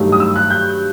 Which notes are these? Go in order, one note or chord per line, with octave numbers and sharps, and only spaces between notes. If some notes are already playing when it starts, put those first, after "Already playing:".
Already playing: G2 D#3 F#3 A3
D#6
E6
F#6
G6